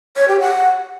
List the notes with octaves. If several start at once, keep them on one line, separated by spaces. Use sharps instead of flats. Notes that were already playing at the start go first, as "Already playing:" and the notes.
C#5
G4
F#5